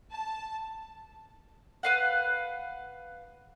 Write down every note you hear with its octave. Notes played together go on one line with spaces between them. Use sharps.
A5
B4 F5 F#5